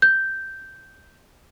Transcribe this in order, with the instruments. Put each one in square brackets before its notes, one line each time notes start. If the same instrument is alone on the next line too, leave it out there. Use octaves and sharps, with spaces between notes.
[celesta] G6